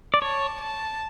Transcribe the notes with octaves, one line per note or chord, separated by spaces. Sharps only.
D5
C#5 A5
A5